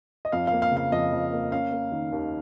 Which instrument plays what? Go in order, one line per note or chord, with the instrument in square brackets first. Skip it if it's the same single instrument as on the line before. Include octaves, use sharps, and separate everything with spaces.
[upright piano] D#5
F2 F5
A#3 F5
F5
C#3
F5
F2 D#5
F2
A#3
C#4 F5
A#3
D#3
D#2